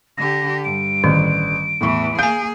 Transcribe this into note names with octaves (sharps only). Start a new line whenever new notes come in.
D3 G4 A#6
G2 D7
A1 D3 D#3
E2 A2 E3 C#6
A#3 G#4 F5 G#5 G6